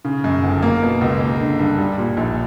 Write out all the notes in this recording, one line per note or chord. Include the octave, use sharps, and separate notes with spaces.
C#3
F#2
G1
A#3
B2
C#2
A#3
D3
G2
G3
A#2
A#1